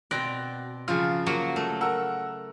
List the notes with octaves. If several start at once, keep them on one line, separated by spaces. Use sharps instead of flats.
B2 C4 D5 F#6 A#6
C#3 F3 F#3 F4 F6
F#3 A#3 F#4
A3
A#4 F#5 E6